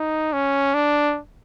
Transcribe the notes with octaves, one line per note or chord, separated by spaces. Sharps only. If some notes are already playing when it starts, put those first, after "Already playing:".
Already playing: D#4
C#4
D4